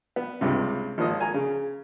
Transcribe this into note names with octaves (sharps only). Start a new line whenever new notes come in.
B3
C#2 G2 C3
G#1 F3 A#3 D#5 D#6
G#5 A#5
C#3